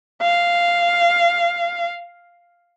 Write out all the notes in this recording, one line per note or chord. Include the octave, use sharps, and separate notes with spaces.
F5